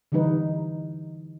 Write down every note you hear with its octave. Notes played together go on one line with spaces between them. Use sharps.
D3 E3 G3 D#4 B4